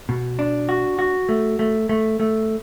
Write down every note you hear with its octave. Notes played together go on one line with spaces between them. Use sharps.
B2
D4
F#4
F#4
A3
A3
A3
A3